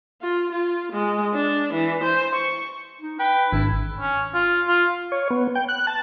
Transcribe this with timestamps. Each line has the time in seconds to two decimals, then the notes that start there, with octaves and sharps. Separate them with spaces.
0.22 F4
0.51 F4
0.92 G#3
1.34 D4
1.73 E3
2.03 C5
2.35 C#6
3.01 D#4
3.19 B4 G5
3.53 G#1 D4 E4
4.00 C#4
4.34 F4
4.68 F4
5.12 C#5
5.30 B3
5.55 G5
5.68 F#6
5.87 A5